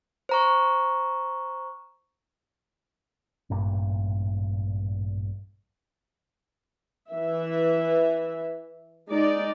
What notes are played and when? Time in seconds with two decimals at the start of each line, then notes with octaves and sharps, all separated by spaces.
0.29 C5 A#5 C#6
3.50 A1 G2 A#2
7.10 E3 E5
9.10 G#3 D#4 D5